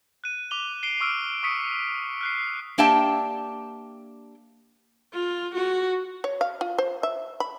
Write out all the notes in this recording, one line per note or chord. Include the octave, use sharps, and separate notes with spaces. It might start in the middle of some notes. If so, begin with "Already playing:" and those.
F#6 D#7
D6 F7 G7
C7 D7 G7
C#6 D6 E6 F6 D7
C#6 D#6 B6 C#7
F6 F#6 C7
A#3 D4 G4 E5 G5 A5
F4
F#4
C#5
F5
F4
C5
E5
B5